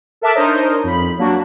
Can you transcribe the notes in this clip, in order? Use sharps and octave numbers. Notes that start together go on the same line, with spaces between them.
A4 A#4 E5 A5 D6 F#6
D4 D#4 A#4 C5 C#5 D#5
F2 B5
F#3 A#3 D4 F#4